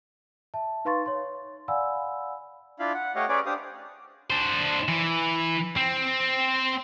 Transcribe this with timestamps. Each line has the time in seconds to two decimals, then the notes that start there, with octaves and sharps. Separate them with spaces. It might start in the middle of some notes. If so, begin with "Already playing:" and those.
0.54 E5 A5
0.85 D#4 B4 F5 C6 C#6 A6
1.06 C#5 C6
1.68 D5 F5 F#5 G#5 B5 E6
2.79 D4 E4 F4 F5 B5
2.94 F#5
3.16 A3 G4 C#5 D#5 F5 F#5
3.29 C#4 G#4 B4 C#5 D5 D6
3.46 D4 G4 C5 F5 D#6
4.30 D4 C5
4.88 E3
5.77 C4